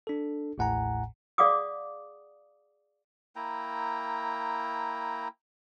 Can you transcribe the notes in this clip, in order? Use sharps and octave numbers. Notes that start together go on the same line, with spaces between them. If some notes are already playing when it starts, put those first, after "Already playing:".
D4 A4
A1 D#2 A2 F#5 G#5 A#5
G#4 D5 F5 F#5 D6 D#6
A#3 E4 G5 A#5